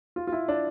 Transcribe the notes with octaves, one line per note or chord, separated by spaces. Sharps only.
F4
F4
E4
D4